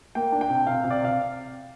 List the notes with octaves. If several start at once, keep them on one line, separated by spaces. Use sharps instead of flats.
A#3 G5
D4
G5
C3
C3 F5
C3
D5
C3 F5